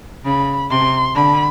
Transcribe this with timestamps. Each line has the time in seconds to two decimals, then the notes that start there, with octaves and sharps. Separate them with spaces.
0.25 C#3 B5
0.70 C3 C6
1.15 D3 B5